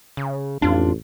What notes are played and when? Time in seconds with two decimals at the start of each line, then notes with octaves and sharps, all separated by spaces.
0.17 C#3
0.62 A1 F2 D4 F4